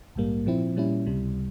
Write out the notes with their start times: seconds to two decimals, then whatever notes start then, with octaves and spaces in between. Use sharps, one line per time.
0.15 A#1 G#2 G3 A#3
0.46 A#2 F3 C4 E4
0.76 A#2 G3 C#4 E4
1.06 C#2 C3 G3